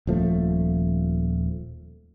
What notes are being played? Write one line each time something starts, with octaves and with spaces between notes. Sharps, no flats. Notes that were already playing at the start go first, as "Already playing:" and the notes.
D#1 F3 A3